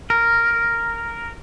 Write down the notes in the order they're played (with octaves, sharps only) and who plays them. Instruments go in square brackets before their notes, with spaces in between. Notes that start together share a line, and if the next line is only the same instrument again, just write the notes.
[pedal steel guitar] A#4